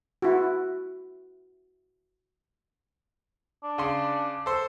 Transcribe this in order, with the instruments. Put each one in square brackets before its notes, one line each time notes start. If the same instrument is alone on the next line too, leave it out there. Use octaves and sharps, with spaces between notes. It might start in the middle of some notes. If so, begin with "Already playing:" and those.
[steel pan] E4 F#4
[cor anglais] D4
[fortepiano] C#3 C6
A4 C5